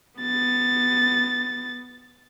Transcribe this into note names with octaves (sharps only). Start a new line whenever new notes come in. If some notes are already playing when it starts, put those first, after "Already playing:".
B3 A6